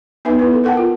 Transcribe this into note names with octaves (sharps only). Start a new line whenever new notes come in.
B3 D#4 B4 E5 G#5
B3 E4 B4
A4
A4 A#4 F#5 G5 A5
F4